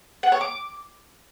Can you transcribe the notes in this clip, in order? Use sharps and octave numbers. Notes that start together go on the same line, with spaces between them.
F#5
C#5
D6